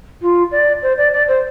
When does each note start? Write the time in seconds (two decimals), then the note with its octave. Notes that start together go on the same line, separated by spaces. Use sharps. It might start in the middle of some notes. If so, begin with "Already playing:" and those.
0.22 F4
0.52 D5
0.82 C5
0.97 D5
1.13 D5
1.28 C5